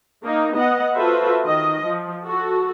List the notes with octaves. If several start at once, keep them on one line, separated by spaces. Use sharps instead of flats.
A#3 D#4
B3 D#5 F#5
F4 F#4 A4 B4 C5 E5
D#3 D#5
F3
F#4 A4